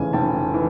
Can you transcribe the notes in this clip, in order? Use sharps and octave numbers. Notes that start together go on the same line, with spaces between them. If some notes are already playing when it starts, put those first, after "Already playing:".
Already playing: F1 F2 C#3 E3 G#5
F1 G5 A5
E3